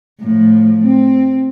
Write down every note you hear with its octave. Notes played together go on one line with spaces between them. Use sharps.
A2 F3
C4